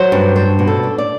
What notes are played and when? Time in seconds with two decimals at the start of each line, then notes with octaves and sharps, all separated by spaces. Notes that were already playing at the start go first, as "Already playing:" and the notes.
Already playing: F#3 C5
0.12 G2
0.36 D4 C5
0.59 B2
0.67 A4
0.83 D4
0.98 D5